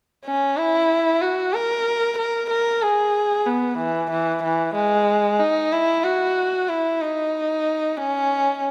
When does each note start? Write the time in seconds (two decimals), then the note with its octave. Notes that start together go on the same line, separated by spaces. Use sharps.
0.25 C#4
0.57 E4
1.21 F#4
1.53 A#4
2.18 A#4
2.50 A#4
2.82 G#4
3.47 B3
3.78 E3
4.11 E3
4.44 E3
4.75 G#3
5.39 D#4
5.73 E4
6.04 F#4
6.69 E4
7.01 D#4
7.97 C#4